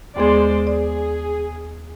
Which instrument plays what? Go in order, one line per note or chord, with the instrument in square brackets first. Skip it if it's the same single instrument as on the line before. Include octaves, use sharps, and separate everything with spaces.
[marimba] D#2 B3 G#4 [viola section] G#3 C5 D5
[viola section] G#4 [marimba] D5